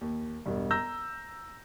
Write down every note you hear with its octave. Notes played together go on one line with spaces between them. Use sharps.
D#2
E1 G2
A#5 E6 G6 A#6